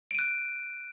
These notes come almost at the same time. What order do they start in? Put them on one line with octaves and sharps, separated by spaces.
D7 D#7 F#6